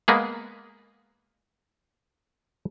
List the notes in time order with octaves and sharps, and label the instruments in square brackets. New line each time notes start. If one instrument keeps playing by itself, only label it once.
[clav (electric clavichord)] G#3 A#3 B3 G#4